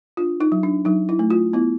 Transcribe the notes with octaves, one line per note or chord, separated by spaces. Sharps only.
D4 F4
D#4
F#3
D4
F#3 D#4
E4
A3
F4
B3 E4